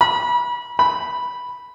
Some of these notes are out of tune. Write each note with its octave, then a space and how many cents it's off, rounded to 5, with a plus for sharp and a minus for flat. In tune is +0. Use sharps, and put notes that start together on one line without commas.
B5 -30
B5 -5